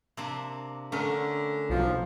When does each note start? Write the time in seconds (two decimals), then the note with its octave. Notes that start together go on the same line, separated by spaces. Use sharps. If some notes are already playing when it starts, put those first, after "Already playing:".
0.17 C3 A#3 D4
0.92 D3 A3 C#4 A#4
1.69 B1 F3